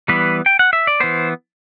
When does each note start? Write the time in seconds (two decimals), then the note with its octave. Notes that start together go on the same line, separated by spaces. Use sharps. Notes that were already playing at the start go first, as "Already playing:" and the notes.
0.08 E3 G3 B3 B4
0.46 G5
0.59 F#5
0.73 E5
0.87 D5
1.00 E3 B3 C5